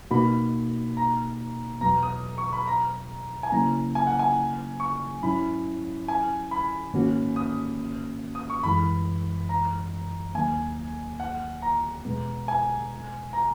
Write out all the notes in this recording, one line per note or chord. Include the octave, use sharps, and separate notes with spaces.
B2 A#3 D#4 F#4 B5
A#5
E2 B2 F#3 B3 A#5
D#6
C#6
B5
A#5
G#5
C#3 F#3 A#3 C#4 E4 A#5
G#5
F#5
G#5
C#6
G#2 F#3 C#4 E4 B5
G#5
B5
G#2 D#3 A#3 C#4 F#4
D#6
D#6
C#6
F#2 E3 G#3 B5
A#5
D#2 D#3 F#3 A#3 G#5
F#5
A#5
E2 B2 G#3 B3
G#5
A#5